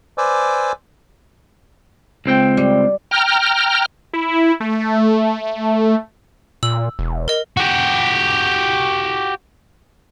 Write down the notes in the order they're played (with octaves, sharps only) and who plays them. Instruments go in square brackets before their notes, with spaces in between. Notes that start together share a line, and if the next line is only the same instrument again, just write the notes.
[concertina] B4 C5 D5 G#5 D6 E6
[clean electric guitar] C#2 C4 G5
[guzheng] G3
[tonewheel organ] G5 A#5 F6
[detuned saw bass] E4
A3
[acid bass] A#2 [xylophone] E6 F#7
[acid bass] E1
[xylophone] A#4 D#5
[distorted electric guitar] F#4 G4